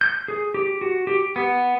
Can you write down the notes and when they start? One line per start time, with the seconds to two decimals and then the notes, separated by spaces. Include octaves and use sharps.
0.01 G6
0.28 G#4
0.54 G4
0.81 F#4
1.07 G4
1.36 B3